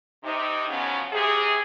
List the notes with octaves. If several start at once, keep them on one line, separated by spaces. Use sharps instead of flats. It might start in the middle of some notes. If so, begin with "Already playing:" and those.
C3 D#4
C#3 F3 F#3 B3 C#4
C3 G#4